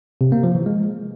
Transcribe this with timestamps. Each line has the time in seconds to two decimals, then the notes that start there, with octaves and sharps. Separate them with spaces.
0.21 C3
0.32 A#3
0.43 F3
0.55 E3
0.66 G#3